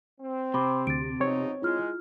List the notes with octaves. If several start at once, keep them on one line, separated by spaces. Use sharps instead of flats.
C4
C3 B5 C6 D6
D2 A6 D7
F2 B2 C4 D#4 C#5
G#3 E4 F4 F6